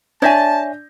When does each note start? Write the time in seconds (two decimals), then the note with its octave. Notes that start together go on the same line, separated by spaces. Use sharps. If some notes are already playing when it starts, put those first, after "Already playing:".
0.22 D4 C#5 E5 G#5 A5 G6 A#6